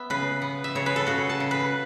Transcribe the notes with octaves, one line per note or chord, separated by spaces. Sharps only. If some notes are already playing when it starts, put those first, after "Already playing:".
Already playing: B3 E5
C#3 B4
B3
E5
C#3 C#5
B4
A4
C#3 F#4
A5
C#3
B4